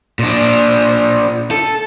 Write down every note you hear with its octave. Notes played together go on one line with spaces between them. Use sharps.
A#2 D4
A4